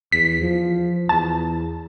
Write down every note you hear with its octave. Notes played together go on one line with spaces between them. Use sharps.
E2 B6
F3
E2 A5